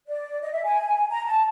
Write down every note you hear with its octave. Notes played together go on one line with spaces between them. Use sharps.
D5
D#5
E5
G#5
A#5
A5